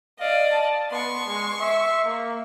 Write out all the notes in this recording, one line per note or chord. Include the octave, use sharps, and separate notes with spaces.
D5 D#5 F5
A5
B3 C6 C#6
G#3
E5
A#3